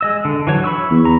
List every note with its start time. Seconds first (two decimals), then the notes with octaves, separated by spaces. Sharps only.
0.01 G#3 D#5 E6
0.25 D3
0.47 E3 F#3 C#5
0.64 B5 C#6 E6
0.91 E2
1.05 A#5